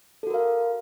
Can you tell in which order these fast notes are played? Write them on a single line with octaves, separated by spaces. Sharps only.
A4 F#4 A#4 F5